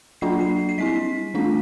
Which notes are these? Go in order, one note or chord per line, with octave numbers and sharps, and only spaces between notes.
F#3 A#3 D4 F4 C7
C7
C7
G3 C4 E4 B6
E3 A3 D4 F4